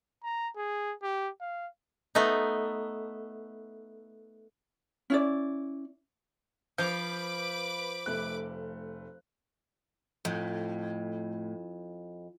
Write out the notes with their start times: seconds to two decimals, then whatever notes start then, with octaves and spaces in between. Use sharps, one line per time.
0.23 A#5
0.56 G#4
1.03 G4
1.40 F5
2.15 A3 B3 D#4
5.10 C#4 E4 D5
6.78 F3 B4 F5 D6 G6
8.06 F1 A3 F#6
10.25 F2 A2